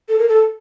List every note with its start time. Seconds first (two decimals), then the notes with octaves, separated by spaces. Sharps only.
0.09 A4
0.19 A#4
0.28 A4